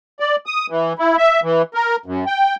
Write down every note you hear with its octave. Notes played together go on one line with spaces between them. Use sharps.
D5
D#6
E3
E4
E5
E3
A#4
F#2
G5